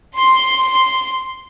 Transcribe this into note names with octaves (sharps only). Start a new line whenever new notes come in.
C6